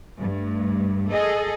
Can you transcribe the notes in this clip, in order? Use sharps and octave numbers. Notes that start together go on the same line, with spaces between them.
G2 A3
G#4 A4 D#5